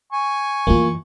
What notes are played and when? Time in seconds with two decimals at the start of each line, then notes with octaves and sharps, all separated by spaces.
0.12 G#5 C#6
0.67 F#2 E3 A#3 F4